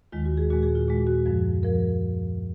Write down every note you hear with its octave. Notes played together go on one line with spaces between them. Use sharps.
D#2 D#3 G#3 F4
F#4
G#4
A#2 G#3 F#4
G#4
F4
A#2 G#3 F#4
F#4
F#2 F3 G#3 F#4
F3 A#4